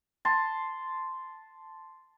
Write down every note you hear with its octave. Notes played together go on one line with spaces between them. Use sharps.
A5 C6